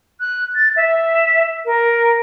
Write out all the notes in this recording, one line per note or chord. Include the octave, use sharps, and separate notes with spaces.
F#6
A6
E5
A#4